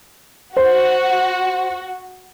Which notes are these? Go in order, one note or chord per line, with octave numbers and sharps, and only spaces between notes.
F#4 C5